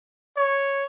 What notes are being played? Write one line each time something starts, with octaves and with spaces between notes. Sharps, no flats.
C#5